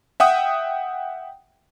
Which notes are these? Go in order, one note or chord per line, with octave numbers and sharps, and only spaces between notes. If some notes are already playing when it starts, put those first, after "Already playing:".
E5 F#5 G5 D#6